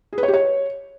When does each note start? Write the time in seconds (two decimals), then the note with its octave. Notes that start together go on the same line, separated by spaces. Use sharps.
0.13 G#4
0.18 B4
0.23 C#5
0.28 G4
0.33 C#5